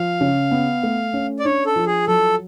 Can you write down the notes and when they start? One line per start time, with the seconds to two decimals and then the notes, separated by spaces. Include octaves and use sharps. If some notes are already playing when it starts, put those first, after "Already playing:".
Already playing: F3 F5
0.21 C#3
0.51 B3
0.83 A3
1.14 C#4
1.39 D5
1.45 D4 C#5
1.66 A4
1.76 F3
1.86 G#4
2.07 F#3 A4